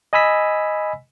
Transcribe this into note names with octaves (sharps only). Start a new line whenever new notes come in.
D#5 G#5 B5 E6 B6